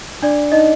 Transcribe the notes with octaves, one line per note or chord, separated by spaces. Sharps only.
D4 D5
D#4 D#5